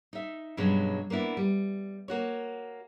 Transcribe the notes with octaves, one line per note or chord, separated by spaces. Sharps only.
D#4 E5
G2 B2 F#3 G#3 C#4
A#3 B3 D4 E4
G3
A#3 F#4 C#5